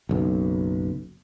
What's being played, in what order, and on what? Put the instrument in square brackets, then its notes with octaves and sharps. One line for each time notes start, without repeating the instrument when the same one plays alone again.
[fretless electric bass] F#1 B1